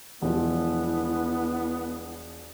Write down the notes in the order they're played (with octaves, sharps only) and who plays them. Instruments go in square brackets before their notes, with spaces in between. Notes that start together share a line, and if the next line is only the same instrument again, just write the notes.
[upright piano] E1 F3 [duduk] B3 [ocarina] E4